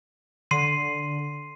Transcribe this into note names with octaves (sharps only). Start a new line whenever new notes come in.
D3 C6 C7 D#7